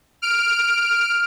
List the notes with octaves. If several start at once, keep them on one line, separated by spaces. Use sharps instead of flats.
F6 D7